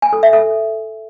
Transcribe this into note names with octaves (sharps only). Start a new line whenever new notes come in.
G#5
A4
E5
A4